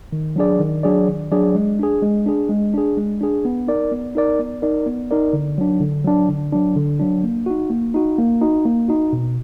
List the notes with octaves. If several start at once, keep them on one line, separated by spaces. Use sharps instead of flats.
D#3
F#3 D4 G#4 D5
D#3
F#3 D4 G#4 D5
D#3
F#3 D4 G#4 D5
G#3
D4 G#4
G#3
D4 G#4
G#3
D4 G#4
G#3
D4 G#4
B3
D#4 A#4 D5
B3
D#4 A#4 D5
B3
D#4 A#4 D5
B3
D#4 A#4 D5
D3
F#3 D4
D3
F#3 D4
D3
F#3 D4
D3
F#3 D4
A#3
D#4 F#4
A#3
D#4 F#4
A#3
D#4 F#4
A#3
D#4 F#4
B2